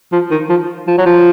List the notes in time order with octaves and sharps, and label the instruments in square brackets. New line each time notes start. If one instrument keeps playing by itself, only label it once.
[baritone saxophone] F3
D#3
F3
F3
F#3
F3